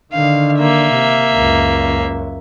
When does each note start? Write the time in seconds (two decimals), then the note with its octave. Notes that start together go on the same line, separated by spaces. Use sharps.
0.13 D3 D#3 F5
0.59 A#3 E5
0.93 C3
1.34 C#2 F#2